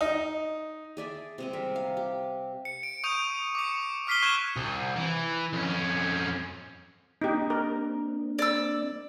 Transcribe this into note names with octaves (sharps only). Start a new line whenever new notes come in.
D#4
G#4 D5 E5 A5
C3 G#3 C4
G3 A#4 E5
F5
G4
C#7
D7
C#6 D#6 G6 D#7 F7
D6 C#7
D6 F6 B6 C7 D#7 G7
C#6 F6 F#6 G#6 D#7 E7
C2
E3
F2 C#4
A#3 C4 D4 D#4 G4
A#4
D5 E6